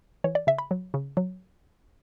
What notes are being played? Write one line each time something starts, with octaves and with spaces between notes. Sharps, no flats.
E3 C#5
D5
C#3 E5
B5
F#3
C#3
F#3